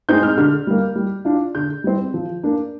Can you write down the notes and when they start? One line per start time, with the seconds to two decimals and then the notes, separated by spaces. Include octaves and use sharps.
0.09 G#3 C4 D#4 G6
0.23 F6
0.37 D3 F6
0.67 G3 A#3
0.96 G3
1.25 D4 F4
1.55 D3 G6
1.84 G3 C4
2.14 F3
2.43 A#3 D4